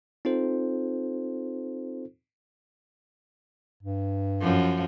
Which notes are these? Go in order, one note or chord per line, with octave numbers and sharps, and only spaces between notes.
C4 D#4 F4 A4 C5
G2
F#2 F3